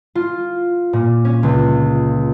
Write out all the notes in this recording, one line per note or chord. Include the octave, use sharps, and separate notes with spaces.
F4
A#2
C#4
C#2